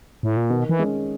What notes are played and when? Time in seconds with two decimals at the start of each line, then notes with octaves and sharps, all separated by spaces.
0.23 A2
0.37 A#2
0.50 B2 D#3
0.69 E3
0.79 G#3 C#4